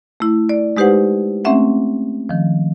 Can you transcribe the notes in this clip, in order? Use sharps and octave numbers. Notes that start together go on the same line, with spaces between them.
A3 E4
D5
G#3 D#4 G4 B4 C5 F#5
A3 C4 C#4 E5 F#5
D#3 F3